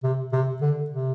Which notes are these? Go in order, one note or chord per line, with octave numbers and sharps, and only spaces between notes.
C3
C3
D3
C3